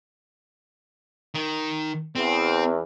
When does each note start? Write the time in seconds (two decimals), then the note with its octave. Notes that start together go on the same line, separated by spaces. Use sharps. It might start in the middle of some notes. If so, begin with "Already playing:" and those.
1.34 D#3
2.16 E2 C4